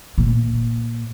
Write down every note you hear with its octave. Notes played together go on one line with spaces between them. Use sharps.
A#2